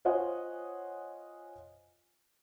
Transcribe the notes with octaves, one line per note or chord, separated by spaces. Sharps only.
F4 C5 C#5 D#5 F#5 G#5